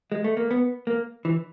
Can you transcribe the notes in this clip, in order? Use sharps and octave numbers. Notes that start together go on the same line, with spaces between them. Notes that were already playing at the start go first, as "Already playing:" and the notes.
G#3
A3
A#3
B3
A#3
E3